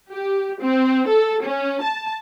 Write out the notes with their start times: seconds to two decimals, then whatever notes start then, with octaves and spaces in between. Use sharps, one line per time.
0.11 G4
0.62 C4
1.07 A4
1.44 C#4
1.82 A5